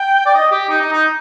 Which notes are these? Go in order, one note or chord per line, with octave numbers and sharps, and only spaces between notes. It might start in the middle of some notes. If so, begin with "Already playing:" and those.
Already playing: G5
D5
D#5
G4
D#4
D#4
D#4